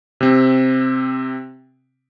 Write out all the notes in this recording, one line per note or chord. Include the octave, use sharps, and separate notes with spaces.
C3 C4